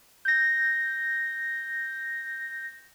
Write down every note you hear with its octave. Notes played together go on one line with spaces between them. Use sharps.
G6 A#6